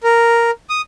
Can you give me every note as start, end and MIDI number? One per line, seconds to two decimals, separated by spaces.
0.04 0.51 70
0.70 0.81 87